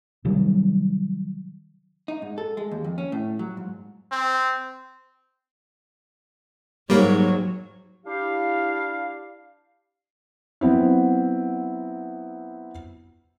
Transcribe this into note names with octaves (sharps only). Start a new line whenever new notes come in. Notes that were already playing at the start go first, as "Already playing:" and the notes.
C3 D#3 F#3 G3
D#4
G#2
A4
G#3
D#2
F2
C#4
A2
F#3
G#2
C4
G#2 F#3 G3 A#3 C#5
D4 E4 G4 F5
F#3 B3 C4 E4